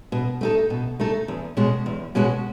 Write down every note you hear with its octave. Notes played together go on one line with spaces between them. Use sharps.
B2
A3 D#4 A4
B2
A3 D#4 A4
E2
B2 G#3 C#4 F#4
E2
B2 G#3 C#4 F#4